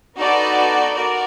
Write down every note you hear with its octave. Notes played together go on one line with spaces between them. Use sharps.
B3 D#4 F#4 A4 D5
F#4 A#4 D5